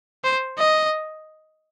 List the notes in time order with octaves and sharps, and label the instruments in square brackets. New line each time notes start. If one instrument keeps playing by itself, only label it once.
[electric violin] C5
D#5